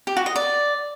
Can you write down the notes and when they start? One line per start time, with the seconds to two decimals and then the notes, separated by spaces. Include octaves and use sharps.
0.07 G4
0.17 F#4
0.26 D#5
0.36 D5